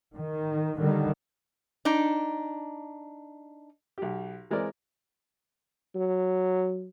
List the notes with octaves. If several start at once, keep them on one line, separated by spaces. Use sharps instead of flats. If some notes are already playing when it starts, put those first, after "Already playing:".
D#3
D3 D#3 G3
D4 D#4
B1 G4
E3 G#3 C4 A#4 D5
F#3